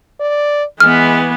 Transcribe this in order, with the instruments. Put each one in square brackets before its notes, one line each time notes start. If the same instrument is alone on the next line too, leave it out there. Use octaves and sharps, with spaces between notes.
[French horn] D5
[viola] E3 B3 [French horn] G#3 [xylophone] F6